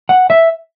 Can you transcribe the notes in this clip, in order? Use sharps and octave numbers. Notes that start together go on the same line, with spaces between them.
F#5
E5